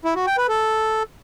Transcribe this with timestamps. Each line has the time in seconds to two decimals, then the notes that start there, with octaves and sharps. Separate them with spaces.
0.05 E4
0.16 F#4
0.27 G5
0.38 B4
0.49 A4